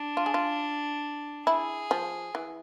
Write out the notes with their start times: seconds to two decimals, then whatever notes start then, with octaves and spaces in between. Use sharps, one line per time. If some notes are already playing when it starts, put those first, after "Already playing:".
Already playing: D4
0.17 F4
0.26 G#4
0.34 F4
1.47 E4 G#4
1.91 F3
2.35 E3